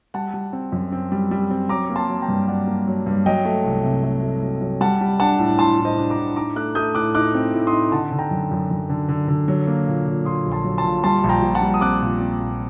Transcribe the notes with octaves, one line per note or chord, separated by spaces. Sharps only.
G3 F#5 A5
G3
C4
F#2
C4
G3
G3
C4
F#3 A#5 D6
A#3
A5 C6
F#3
G5 A#5
G2
F#3 D5 F#5
A#3
F#3
G2
F#3 D#5 G5
A3
C2
C3
A3
A3
F#3
F#3
G3 F#5 A5
G3
D4 F#5 A5
A2
A2 A5 C6
A2
C5 D#5
D4
A#5 D6
A2
D#4 A#5 D6
A3 D6 F#6
A3 D#6 G6
A2 D6 F#6
D#4 D6 F#6
C4
A2
C6 D#6
D#4
D3 F#5 A5
D3
G5 A#5
F#2
F#2
F#2
D3
D3
D3
F#3
A#3
A#2
A#2
A#2 C6 D#6
A#1
A5 C6
F#3
A5 C6
A#2
G3 A5 C6
A#1
G5 A#5
A#1
F#5 A5
G3
D#6
C4 D6 F#6
A#2
C4
A#1